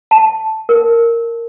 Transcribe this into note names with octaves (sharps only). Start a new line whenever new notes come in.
A5
A#4